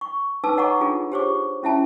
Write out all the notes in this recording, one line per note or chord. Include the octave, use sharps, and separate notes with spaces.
C#6
D#4 A4 B4 A5 D6 E6
C#5 D#5 F#5 A#5 C#6 D6
D4 F4 G#4 A4
G4 G#4 C5 C#5 C#6 D6
C#4 E4 E5 A5